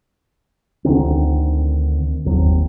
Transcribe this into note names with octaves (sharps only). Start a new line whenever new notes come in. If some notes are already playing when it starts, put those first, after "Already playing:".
D2 D3 D#3 C4
F#1 D#2 F#3 C4